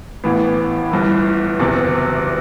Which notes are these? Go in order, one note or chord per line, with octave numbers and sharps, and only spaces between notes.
A1 A2 E3 B3
G1 G2 E3
F#1 E2 C3